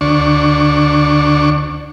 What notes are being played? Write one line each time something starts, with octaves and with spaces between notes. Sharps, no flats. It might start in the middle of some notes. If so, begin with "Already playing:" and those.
D2 D4 C#6